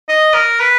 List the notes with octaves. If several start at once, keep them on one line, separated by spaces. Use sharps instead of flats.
D#5
A#4
B4